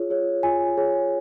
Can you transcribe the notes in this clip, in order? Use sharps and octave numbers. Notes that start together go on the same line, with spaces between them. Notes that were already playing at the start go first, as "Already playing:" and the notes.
Already playing: F4 G#4 C#5
G#4 C#5
F4 G#5
G#4 C#5